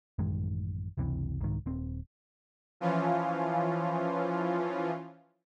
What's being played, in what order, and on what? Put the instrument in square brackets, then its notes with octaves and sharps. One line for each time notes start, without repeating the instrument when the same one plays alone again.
[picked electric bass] A1 F#2 D#3 G#3
F#1 C#2 C3 E3
C2 G#2 D#3
D#1 C4
[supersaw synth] E3 F3 C#4 F4